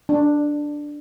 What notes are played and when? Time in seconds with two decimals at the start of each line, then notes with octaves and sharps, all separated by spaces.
0.09 D4